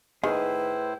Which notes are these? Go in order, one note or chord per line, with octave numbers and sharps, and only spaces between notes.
A2 D#3 E4 G#4 B4 C5